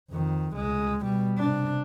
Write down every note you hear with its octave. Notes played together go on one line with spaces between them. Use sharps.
F2 D#3
C#2 G#3
B2 G3
C3 D4